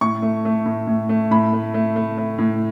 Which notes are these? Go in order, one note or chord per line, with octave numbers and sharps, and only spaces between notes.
A2 C#6
A3
A3
A2
A2
A3
A2 B5
A3
A3
A3
A3
A2